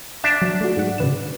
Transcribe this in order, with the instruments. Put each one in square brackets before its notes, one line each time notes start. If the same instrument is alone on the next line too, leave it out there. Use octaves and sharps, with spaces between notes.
[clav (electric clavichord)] D4 E5 A5
[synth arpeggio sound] F#3
A3 F#4
G#2 F#5
C#3 B4 E7